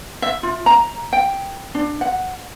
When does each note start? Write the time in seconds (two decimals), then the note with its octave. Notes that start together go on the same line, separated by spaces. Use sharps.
0.22 E5
0.43 F4
0.66 A#5
1.13 G5
1.75 D4
2.01 F#5